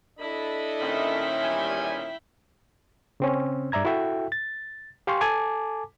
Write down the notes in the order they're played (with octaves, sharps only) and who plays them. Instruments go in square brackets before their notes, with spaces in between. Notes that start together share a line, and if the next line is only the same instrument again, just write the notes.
[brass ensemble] D4 A4 D#5 [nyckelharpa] E4 B5
[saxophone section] A#2 D#3 C#4 [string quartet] E5 G5
[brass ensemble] E2 G3 G#5
[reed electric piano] C#3 C4 C#4
G2 D5 E5 A#5 G#6
E4 F#4 A4 E5 G5
A6
G4 F5 G5 G#5 C6 C#6
A4 G#5 A5 D6